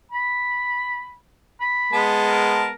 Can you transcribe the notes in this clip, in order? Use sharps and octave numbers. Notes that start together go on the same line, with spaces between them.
B5
B5
G#3 B3 A5
A#4